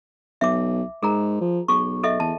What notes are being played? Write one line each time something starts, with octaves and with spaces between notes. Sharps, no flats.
B1 E5 D6
G#2 G#4 A#4 A#5
F3
B1 G#4 C#6
A4 D#5 E5
E2 A5